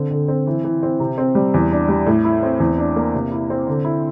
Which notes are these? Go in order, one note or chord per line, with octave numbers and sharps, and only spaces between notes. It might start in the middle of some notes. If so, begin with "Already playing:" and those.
Already playing: D3 C4
D3
C4
E3
E3
C4
C3
C4
G3
E2
D4
G3
A2
E4
C4
E2
D4
A#3
C3
E4
C4
D3
E4